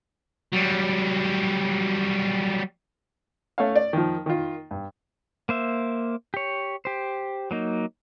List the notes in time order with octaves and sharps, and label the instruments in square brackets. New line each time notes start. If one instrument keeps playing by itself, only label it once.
[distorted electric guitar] F#3 G3
[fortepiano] A3 C#4 C#5 F5
D5
D#3 F3
D#3 F4
G2
[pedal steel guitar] A#3 C5 E5
G4 C#5
G4 C5
F#3 A#3 D#4